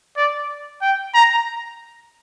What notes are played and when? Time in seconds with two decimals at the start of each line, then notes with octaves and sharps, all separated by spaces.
0.16 D5
0.82 G5
1.14 A#5